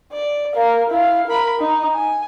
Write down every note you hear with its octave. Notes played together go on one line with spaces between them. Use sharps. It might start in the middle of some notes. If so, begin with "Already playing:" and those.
D5
A#4 F5
E4 F5
A#4 B5
D#4
G#5